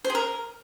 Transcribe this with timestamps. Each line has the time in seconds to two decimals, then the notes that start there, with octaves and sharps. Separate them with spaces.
0.04 C5
0.10 G#4
0.15 A#4